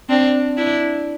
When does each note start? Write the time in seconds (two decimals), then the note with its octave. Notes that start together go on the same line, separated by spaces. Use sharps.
0.09 C4 D4
0.57 D4 E4